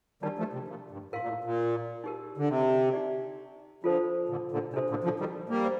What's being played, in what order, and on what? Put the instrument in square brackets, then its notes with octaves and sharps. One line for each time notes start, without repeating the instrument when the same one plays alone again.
[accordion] D#3 G3 [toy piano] D4 G4 A#4 D5 A5
[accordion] F3 A3
C3
A#2
G2
[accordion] A2 [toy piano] A#4 F5 C6
[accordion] A#2
A2
A#2
[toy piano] D#4 G4 A#4
[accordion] D3
C3
[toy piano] D#4 G4 D5
[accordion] D3 F3 [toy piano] F4 A4 C5
[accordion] A#2 D3
A#2 D3
[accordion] C3 [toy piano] D4 A4 C5
[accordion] A#2 D3
D3 F3
D#3 G3
G3 A#3
[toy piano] C5